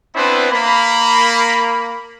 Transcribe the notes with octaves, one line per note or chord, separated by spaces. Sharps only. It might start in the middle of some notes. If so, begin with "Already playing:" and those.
B3 C4 D4 E4 B4 C5
A#3 B5